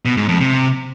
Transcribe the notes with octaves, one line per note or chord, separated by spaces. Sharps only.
B2
G#2
F2
C3